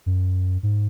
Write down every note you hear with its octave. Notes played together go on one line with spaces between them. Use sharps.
F#2
G#2